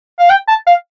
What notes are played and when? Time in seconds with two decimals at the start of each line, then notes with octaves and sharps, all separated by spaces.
0.20 F5
0.30 G5
0.48 A5
0.67 F5